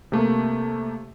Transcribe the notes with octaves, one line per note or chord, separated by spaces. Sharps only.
C3 A3 A#3